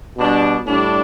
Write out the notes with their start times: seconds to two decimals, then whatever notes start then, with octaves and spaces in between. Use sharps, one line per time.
0.16 B2 G3 D4
0.66 A2 G3 D4